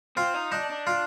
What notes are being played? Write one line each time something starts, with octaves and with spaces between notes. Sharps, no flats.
C4 F4
D#4
D4 D#4
D4
F4